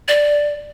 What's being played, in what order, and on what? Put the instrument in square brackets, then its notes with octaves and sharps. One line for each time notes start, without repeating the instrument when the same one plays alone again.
[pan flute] D5